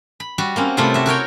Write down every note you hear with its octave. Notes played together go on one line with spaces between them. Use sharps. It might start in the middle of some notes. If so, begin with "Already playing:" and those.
B5
G3 F#4
A#3 C4 C#4
C3 G3 A3 E4 F4
F#4 E5
F#4 A#4 C#5 G5